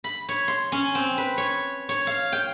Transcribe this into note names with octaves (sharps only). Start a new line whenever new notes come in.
B5
C#5
C6
C#4
C4
B4
C#5
C#5
F5
G5